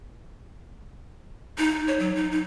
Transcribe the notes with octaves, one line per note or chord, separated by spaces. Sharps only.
D#4
C#5
F#3
D#4
D#4